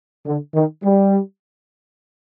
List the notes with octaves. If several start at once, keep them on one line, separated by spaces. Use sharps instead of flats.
D3
D#3
G3